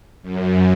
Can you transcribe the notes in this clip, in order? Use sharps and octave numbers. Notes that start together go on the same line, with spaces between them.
F#2